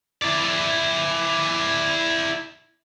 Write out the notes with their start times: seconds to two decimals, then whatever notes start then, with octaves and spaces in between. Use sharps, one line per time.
0.23 E4 D5